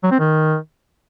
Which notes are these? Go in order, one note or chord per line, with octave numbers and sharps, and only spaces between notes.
F#3
C4
D#3